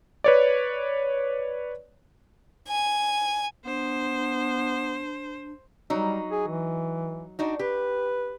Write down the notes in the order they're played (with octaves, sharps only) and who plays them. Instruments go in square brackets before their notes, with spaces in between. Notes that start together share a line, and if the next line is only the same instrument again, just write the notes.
[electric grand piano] B4 C#5 D5
[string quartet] G#5
[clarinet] B3 [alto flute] D4 [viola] C5
[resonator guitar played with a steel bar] F#3 D#4 [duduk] G3
[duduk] G#4
E3
[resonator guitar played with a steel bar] D4 D#4 F#4
[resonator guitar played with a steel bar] G4 [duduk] B4